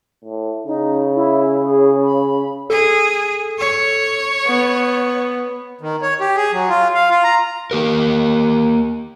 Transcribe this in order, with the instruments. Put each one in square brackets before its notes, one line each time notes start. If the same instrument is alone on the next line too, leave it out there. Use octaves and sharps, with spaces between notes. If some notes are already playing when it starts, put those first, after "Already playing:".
[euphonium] A2
[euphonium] C#3 [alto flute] D#4
[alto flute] E4
G#4
B5
[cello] G#4 [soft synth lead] A4
[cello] C#5
[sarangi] B3
[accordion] D#3
C#5
G4
G#4
F#3
F4
F5
F4
A#5
[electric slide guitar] A#3 G4 A#4